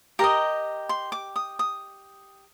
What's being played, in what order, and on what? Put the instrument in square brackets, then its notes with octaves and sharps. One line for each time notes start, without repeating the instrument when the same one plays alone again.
[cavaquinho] G4 A#4 D#5 A#5
C6
D6
D#6
D#6